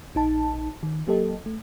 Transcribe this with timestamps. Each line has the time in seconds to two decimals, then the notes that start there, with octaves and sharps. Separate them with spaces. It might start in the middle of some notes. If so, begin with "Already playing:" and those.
0.15 A#1 D#4 A5
0.83 D#3
1.07 F#3 A#3 G4 A4 D#5
1.46 A3